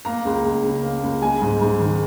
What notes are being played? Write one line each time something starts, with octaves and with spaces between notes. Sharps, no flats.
A#3 A#5
C#2
C#2
C#3
A#3
C#2
G#3 G#5
G#2
G#2
D#3